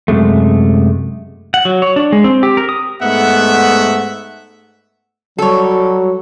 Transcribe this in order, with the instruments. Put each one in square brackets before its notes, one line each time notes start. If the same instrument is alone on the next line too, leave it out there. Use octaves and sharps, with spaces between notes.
[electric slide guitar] F#2 C3 G#3 A3
[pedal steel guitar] F#5
F#3
C#5
D4
G#3
C4
G4
A#4
D#6
[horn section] G#2 A3 B3 E5 F#5
[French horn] F#3 [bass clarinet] G3 [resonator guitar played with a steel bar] A4 C#5